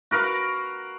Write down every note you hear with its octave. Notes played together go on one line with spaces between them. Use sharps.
F#4 A#4 B4 F5